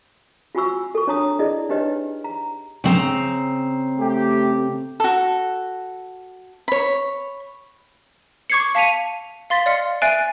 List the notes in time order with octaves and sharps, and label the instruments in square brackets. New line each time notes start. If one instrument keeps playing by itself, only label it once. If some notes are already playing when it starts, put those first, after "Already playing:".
[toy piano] F4 F#4 G#5 B5 C#6 E6
A4 C#6
D4 C#5 A5 A#5 D#6
E4 G#4 D5 D#5
D4 D#4 G4 B4 C#5 D#5
A#5
[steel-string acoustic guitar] C#3 C4 A#5
[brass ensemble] A3 G4
[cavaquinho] F#4 A4
C#5 B5
[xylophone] C#6 D6 G#6 C7 C#7
F5 A5 B6 C#7 D#7 F7
F5 C6 A6 B6
D5 D#5 F5 C6 F6 C#7
E5 G#5 F#6 A6 C7 D7